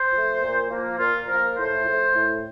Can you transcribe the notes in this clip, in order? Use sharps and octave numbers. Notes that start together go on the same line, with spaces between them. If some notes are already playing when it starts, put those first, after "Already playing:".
Already playing: C5
F3 A3
A#2
F3 A#3
A#2 F4
F3 A#3 A#4
A2 C5
F3 A3
A2